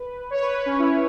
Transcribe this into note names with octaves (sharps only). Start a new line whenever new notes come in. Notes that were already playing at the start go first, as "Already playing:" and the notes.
Already playing: B4
C#5
B4
B4
C#4
E4